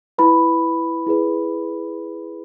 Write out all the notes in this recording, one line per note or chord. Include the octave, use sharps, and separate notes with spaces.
E4 B4 B5
E4 G#4 B4